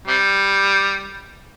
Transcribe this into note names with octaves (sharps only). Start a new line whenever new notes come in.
C3 G3